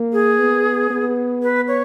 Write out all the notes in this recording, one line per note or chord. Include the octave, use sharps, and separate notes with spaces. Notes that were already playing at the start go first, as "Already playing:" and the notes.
Already playing: A#3
G#4
B3
B3
B4
C#5